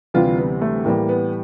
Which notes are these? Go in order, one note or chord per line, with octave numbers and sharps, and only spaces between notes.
D2 C3 E3 G3 F4
B3
A3
A2 E3 G3 A#3
B3